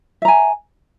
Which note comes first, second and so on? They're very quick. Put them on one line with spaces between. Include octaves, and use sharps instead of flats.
E5 A#5 G#5